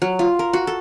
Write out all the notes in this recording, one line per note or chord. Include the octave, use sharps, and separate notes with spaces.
F#3
F4
A#4
F#4
A4